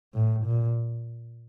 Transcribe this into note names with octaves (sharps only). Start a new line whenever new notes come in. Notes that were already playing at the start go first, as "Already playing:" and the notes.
A2
A#2